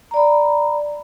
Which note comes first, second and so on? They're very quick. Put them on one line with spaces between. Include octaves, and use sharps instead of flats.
A#5 D5 B5